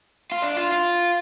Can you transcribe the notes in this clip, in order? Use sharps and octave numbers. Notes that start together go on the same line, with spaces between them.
F4
D4
F4
F4